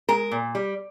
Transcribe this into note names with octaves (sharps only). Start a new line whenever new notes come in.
G#3 A#4
A#2
G3